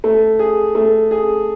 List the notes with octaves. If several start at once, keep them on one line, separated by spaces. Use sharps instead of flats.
A3
G#4
A3
G#4